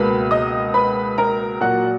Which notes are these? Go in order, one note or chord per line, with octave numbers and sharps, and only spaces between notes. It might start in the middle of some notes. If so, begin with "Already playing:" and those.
Already playing: C#2 B2 A#3 B4 B5
D#5 D#6
B4 B5
A#4 A#5
A#2 F#3 A#3 F#4 F#5